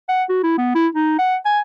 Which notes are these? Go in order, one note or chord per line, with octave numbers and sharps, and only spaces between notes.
F#5
F#4
E4
B3
E4
D#4
F#5
G#5